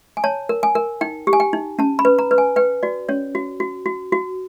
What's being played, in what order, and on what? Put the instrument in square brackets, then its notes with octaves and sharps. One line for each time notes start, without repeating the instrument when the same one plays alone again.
[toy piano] G#5
C#5 A5
A#4
G#5
A#4
D#4 G5
G4
G#5
G5
D#4
C#4 A5
B5
B4
A#5
B4
G#5
B4 G5
F#4 D5
C#4 C#5
F#4
F#4
F#4
F#4